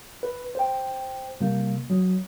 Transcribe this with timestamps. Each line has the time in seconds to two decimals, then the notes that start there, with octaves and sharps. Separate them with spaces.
0.23 B4
0.55 C5 G5
1.41 C3 G3 A#3
1.90 F#3